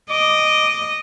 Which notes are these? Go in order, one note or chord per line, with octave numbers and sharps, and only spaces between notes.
D#5 D6